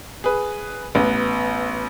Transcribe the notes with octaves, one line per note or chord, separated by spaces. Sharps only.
G#4 B4
A1 B3